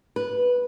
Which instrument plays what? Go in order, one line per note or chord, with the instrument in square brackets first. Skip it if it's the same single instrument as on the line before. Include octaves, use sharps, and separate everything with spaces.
[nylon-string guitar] B4